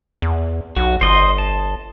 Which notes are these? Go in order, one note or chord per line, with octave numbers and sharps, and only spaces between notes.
E2
B1 F#4
G1 C5 D#5 C6
A5